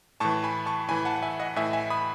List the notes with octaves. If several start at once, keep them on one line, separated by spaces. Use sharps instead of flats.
A2 E3 A5 C#6
G#5 B5
A5 C#6
A2 E3 G#5 B5
F#5 A5
F#5
E5 G#5
D#5 F#5
A2 E3 E5 G#5
E5 G#5
B5 D#6